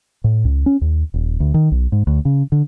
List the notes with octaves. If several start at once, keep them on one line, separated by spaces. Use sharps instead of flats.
A2
C#2
C#4
D#2
D#1
D2
D#3
B1
G#2
D2
C#3
D3